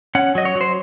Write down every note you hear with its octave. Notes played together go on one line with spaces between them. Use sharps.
C#4 F#5
F#3 D#5
C#5
F#3
C5